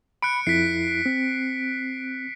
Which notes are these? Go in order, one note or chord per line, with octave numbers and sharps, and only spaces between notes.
B5 F#6 C#7 D7
F2 E4 B6 C7
C4